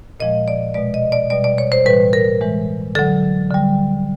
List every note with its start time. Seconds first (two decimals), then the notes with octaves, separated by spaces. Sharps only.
0.20 A#2 F3 G#3 D#5
0.48 D5
0.74 B2 G#3 D5
0.94 D#5
1.12 D5
1.30 B2 G3 D5
1.44 D5
1.58 C#5
1.72 C5
1.86 A2 E3 G3 B4
2.13 A#4
2.40 A2 E3 G#3
2.95 D3 F#3 A4
3.51 D3 G3